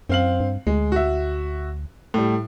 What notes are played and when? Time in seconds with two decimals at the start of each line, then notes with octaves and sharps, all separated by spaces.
0.09 F#2 C4 F5 F#7
0.40 G2
0.67 D2 G#3
0.92 F#4 E5
2.14 A2 G3